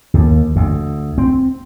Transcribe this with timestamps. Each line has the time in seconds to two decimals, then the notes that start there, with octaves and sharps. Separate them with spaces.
0.14 D#2
0.56 D2
1.18 C4